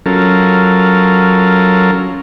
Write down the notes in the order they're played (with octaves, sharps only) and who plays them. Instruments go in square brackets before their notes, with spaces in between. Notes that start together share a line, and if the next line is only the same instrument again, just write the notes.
[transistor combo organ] F#3 C#4 F4 A4 A#4